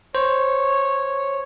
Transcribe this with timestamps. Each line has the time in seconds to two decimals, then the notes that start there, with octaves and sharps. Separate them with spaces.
0.15 C5 C#5